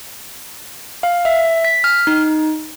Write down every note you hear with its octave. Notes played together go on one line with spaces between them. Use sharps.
F5
E5
B6
F6
D#4